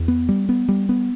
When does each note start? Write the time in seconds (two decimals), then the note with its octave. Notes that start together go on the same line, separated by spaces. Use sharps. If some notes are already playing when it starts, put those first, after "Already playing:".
Already playing: E2
0.08 B3
0.29 G3
0.49 B3
0.69 G3
0.89 B3